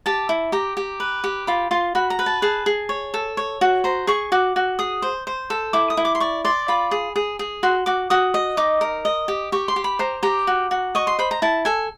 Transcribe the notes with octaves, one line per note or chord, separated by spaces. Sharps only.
G4 A5
E4
G4 A#5
G4
B4
G4
F4 B5
F4 C6
F#4 B5
A#5
B4
A5
G#4 A5
G#4
C#5
A4
C#5
F#4
C5 A#5
G#4 C#6
F#4 D6
F#4
G#4 D#6
C5
C5
A4
E4 D6
D#6
E4
D6
C6
D5 C#6
D5 C6
F4 B5
G#4
G#4
G#4
F#4 C6
F#4 D6
F#4 D#6
D#5
D#4 D6
A#4
D#5
G4
G4 C#6
C6
G4
B5
C5 A#5
G4 A#5
F#4
F#4
D#5 C#6
C6
C5 B5
A#5
E4 A5
A4 G#5